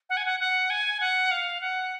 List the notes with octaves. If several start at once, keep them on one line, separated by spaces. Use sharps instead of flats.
F#5
G#5
F#5
F#5
G#5
F#5
F5
F#5